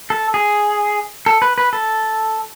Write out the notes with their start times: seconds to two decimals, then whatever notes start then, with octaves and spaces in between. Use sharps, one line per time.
0.10 A4
0.34 G#4
1.26 A4
1.42 B4
1.58 B4
1.73 A4